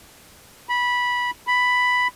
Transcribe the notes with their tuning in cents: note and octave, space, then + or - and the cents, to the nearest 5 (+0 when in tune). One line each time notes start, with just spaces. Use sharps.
B5 -15
B5 +5